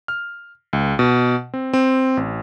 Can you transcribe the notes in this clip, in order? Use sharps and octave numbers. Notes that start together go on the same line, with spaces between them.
F6
C#2
B2
C4
C4
A1